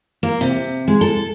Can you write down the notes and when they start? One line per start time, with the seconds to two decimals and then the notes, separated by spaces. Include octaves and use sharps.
0.23 A#3
0.41 C3
0.88 G#3
1.01 A4